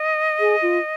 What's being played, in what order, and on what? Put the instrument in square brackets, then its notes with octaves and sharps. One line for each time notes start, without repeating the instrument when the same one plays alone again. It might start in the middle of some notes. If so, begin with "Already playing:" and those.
Already playing: [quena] D#5
[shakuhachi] G#4
F4